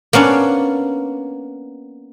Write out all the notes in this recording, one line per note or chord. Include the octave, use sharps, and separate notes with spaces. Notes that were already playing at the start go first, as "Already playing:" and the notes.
A#3 B3 C#4 D4